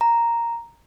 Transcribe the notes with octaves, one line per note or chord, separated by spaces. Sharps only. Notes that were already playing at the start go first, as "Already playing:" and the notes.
A#5